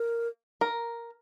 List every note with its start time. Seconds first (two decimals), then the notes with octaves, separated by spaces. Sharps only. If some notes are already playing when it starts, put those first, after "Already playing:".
Already playing: A#4
0.61 A#4